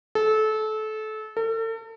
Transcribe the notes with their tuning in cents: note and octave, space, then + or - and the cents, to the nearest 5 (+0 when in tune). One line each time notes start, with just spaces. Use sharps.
A4 -25
A4 +40